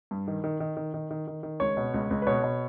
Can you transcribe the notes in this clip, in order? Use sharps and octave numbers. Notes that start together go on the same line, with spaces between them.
G2
D#3
D#3
D#3
D#3
D#3
D#3
D#3
D#3
C#2 C#5
B2
C#2
C#2
B4
B2 C#5
B2